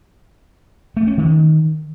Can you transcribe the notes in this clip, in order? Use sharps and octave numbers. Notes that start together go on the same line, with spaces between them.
A3
C#4
D#3